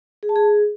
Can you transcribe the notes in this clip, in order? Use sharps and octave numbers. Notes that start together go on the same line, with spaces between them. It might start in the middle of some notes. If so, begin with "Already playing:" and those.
G#4
A5
G#4